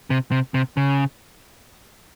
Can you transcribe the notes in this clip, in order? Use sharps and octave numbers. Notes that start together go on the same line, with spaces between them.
C3
C3
C3
C#3